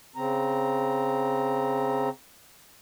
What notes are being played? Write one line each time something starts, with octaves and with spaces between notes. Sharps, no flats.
C#3 C4 A#5